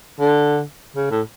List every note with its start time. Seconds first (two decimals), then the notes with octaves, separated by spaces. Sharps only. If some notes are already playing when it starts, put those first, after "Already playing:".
0.20 D3
0.96 C#3
1.11 A2